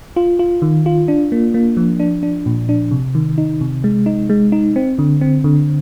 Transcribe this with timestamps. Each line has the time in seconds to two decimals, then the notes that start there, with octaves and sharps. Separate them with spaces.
0.16 F4
0.39 F4
0.62 D#3
0.86 F4
1.08 D4
1.32 A#3
1.54 A#3
1.77 F3
2.00 D4
2.23 D4
2.46 A#2
2.69 D4
2.91 C3
3.15 D#3
3.38 D#4
3.61 C3
3.84 G#3
4.06 D#4
4.30 G#3
4.52 D#4
4.76 C4
4.99 D3
5.21 C4
5.44 D3